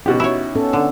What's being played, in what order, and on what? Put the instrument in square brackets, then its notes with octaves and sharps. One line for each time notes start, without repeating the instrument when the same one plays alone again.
[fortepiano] B2 F#4 G4 [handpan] C#4 D#4
[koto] E4 C#5
[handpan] B3 C#4 A4
[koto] D3 [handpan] D4